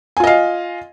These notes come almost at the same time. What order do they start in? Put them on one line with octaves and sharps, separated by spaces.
G#5 F4 D#5 F5